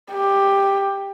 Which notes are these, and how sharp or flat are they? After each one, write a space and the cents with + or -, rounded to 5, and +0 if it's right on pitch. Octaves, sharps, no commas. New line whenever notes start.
G4 +10